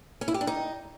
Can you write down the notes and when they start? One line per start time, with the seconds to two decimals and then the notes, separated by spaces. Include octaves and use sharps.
0.21 C#4
0.28 E4
0.34 G4
0.41 D4
0.47 D#4